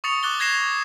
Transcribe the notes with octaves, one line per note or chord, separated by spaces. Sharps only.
C#6 D#6 A6 C#7 F7
D6 F#6 A6 G7
G#6 A#6 C7 E7